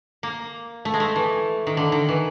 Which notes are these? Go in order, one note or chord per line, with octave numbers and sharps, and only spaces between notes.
A#3
A3
G#3
A3
E3
D#3
D3
D#3
E3